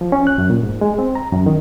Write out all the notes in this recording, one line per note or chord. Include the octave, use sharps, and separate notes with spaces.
F3
C#4
F#6
F#2
A#2
G#2
G#3
C4
A#5
F#2
D#3